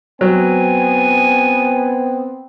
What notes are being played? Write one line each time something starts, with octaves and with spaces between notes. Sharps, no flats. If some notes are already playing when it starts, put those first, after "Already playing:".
F#3 B3 C4 G#5